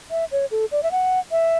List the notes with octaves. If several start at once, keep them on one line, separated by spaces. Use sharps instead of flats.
E5
C#5
A4
D5
E5
F#5
E5